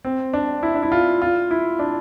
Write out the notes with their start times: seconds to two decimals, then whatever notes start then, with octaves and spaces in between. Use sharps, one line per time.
0.05 C4
0.33 D4
0.63 E4
0.74 D4
0.83 E4
0.92 F4
1.22 F4
1.51 E4
1.79 D4